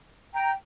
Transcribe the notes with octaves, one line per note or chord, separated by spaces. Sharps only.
G5 A#5